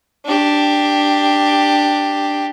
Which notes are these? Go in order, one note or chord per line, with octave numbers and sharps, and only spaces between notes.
D4 G4